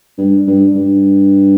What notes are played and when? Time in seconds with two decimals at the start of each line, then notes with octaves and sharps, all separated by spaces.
0.18 G2
0.47 G2
0.76 G2